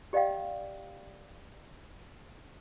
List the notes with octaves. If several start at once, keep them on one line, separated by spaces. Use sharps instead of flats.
G4 D5 D#5 F5 G5